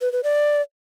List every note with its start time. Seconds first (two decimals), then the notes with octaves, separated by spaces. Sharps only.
0.01 B4
0.13 B4
0.24 D5